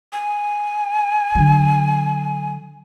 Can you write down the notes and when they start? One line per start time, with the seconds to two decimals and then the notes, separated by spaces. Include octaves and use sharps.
0.13 G#5
1.35 D3 F#3